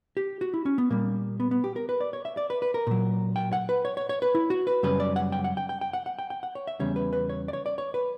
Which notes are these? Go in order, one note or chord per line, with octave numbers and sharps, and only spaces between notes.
G4
F#4
E4
C#4
B3
A#2 G3 A#3
B3
B3
G4
A#4
B4
D5
C#5
E5
D5
B4
B4
A#4
A#2 F#3
G5
F#5
B4
C#5
C#5
C#5
B4
E4
F#4
B4
F#2 C#3 G3 B4
D5
F#5
G5
F#5
G5
G5
G5
F#5
F#5
G5
G5
F#5
C#5
E5
E2 C#3 G3 C#5
B4
B4
C#5
D5
C#5
D5
C#5
B4